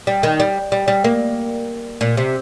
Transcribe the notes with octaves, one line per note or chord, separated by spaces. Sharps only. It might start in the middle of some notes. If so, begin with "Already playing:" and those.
G3
D#3
G3
G3
G3
A#3
A#2
C3